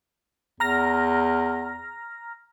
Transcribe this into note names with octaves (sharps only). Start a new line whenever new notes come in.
E2 A#5 F6 A#6